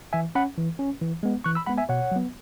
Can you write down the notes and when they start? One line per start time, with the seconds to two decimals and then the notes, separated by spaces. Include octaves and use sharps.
0.13 E3 E5 G#5
0.35 C#4 F#5 B5
0.58 E3
0.79 C#4
1.01 E3
1.23 G#3 B3
1.44 E3 C#6 F#6
1.55 B5 E6
1.66 G#3 B3 F#5 B5
1.78 E5 G#5
1.89 B2 C#5 F#5
2.11 F#3 B3